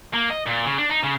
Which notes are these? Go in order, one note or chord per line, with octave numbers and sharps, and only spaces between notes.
A#3
D#5
A#2
C#3
D4
D#4
C#3